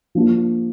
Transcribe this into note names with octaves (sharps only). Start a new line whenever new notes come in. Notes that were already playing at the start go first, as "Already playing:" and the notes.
F3 A#3 D4 F4